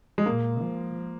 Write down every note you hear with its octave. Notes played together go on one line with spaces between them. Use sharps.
G#3
A#2 A#3
F3